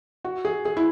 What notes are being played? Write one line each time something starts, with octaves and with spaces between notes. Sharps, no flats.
F#4
G#4
G#4
E4